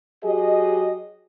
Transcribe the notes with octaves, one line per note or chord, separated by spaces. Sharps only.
F#3 G4 G#4 D#5